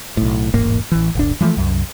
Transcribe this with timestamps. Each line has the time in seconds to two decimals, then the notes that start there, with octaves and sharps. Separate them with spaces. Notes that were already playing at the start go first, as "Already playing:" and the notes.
0.17 B1 A2
0.54 E1 A1 G#2 A#3
0.92 A1 E3
1.15 D1 G1 D4
1.41 E3 F3 G#3 A3
1.57 C2 F#2